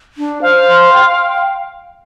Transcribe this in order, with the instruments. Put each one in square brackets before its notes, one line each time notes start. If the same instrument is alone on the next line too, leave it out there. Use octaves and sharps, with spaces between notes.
[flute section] D4
[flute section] C5 [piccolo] F5
[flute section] C6
G5